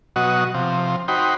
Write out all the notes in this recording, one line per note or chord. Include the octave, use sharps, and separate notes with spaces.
B2 F#3 F#4 D#5
C3 F3
D#4 F#4 C5 G5 B5